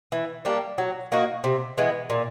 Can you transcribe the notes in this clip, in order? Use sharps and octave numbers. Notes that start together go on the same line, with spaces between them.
E3
G3 A#3 D4
F#3
A#3 D#4 F#4
C3
E3 G#3 B3
A#2